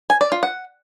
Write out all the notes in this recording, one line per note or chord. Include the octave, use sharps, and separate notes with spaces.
G#5
D5
F4
F#5